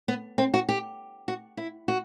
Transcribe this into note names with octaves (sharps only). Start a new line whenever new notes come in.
B3
C4
F#4
G4
F#4
E4
F#4